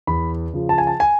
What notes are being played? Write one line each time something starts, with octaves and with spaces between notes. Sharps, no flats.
E2 B5
C#3 F3
A5
G#5
A5
G#5